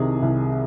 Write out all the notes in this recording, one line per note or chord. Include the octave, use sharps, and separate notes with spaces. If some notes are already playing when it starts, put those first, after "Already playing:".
Already playing: C2 C3 D#3 G#4
C2